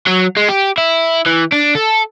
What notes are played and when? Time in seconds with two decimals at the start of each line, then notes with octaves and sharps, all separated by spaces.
0.07 F#3
0.36 G#3
0.48 G4
0.78 E4
1.26 E3
1.52 D4
1.75 A4